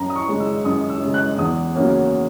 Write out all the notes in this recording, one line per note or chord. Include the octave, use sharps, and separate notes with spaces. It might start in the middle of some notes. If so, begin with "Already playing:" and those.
Already playing: F#2 A#5
D#6
C#6
C#3 G#3
E6
F#2 D#6
E6
C#3 G#3
F#6
E2 D#6
C#3 F#3 A#3 C#4